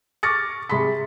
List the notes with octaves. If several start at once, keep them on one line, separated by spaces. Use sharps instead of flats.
C#6 D6 F6 A6 A#6 C#7
C3 G#4 B5 C6 B6